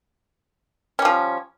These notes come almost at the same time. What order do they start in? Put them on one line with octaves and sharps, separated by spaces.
C#4 G3 F3